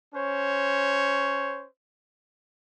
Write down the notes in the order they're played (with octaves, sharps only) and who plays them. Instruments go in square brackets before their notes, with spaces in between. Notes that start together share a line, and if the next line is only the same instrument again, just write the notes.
[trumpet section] C#4 C5 C#5